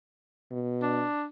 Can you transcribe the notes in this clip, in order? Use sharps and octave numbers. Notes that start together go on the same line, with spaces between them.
B2
D4